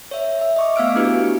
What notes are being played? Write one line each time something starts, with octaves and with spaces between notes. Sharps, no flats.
C#5 E5
E5
D#5 C#6 D6
A3 B3 F5 E6 F6 D7
A3 D4 E4 F#4 G4 B4
B4